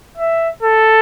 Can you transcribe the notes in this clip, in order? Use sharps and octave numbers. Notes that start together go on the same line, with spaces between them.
E5
A4